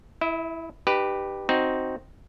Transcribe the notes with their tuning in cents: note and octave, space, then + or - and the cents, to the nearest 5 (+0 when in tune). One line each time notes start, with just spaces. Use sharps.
E4 +0 E5 -45
D#4 -40 G4 +0 B4 +0
C4 +0 D#4 +0 F#4 +0